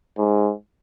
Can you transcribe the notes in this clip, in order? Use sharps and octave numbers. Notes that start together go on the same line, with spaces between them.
G#2